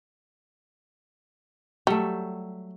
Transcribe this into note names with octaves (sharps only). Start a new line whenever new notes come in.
F#3 G3 A3